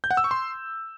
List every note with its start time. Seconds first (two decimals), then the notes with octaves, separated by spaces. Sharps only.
0.04 G6
0.11 F#5
0.17 E6
0.24 C#6
0.31 C6